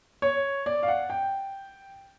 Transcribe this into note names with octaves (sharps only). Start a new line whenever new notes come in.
C#5
D5
F5
F#5
G5